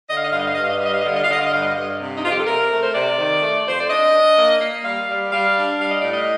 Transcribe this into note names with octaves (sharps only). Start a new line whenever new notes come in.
D3 D#5
F5
D#5
G2 F5
D#5
F5
G2 D#5
F5
D#5
G3 F5
D#5
F5
D#5
D3 F5
D#5
F5
D3 D#5
F5
D#5
G2 F5
D#5
G2
C3
D#4
F2 F4
G4
A4
C3 A#4
A3
C5
C3 D5
D#3
A3
F2 C5
D5
D4 D#5
D4
A#3
A#3
G3 F5
G3
G3 F5
D4
G3 F5
D#5
A2 D5
D#5